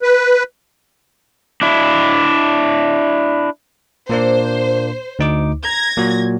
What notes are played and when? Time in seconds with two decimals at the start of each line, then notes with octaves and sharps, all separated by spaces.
0.02 B4
1.61 D4 E4
4.10 A#2 A#3 D4 C5
5.19 D2 D#4 D6
5.65 A#5 G#6 A#6
5.97 A#2 F#3 F#4